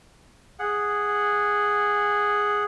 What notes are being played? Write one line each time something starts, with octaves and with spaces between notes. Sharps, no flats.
G#4 F#5